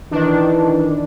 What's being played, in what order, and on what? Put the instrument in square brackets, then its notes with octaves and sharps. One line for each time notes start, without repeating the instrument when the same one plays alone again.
[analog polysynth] D#3 D4 [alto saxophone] E3